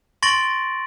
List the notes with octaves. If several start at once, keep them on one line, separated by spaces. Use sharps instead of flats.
C6 C#6 A6 A#6 D7 F#7